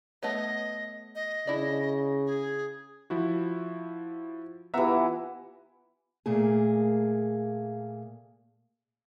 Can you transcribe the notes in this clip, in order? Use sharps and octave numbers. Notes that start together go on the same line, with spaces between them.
A3 B3 C#5 D#5
D#5
C#3 D4 E4 D5
G#4
F3 E4 F#4
E3 B3 F4 G4 E5 F#5 A#5 E6
A#2 A3 A#3 G#4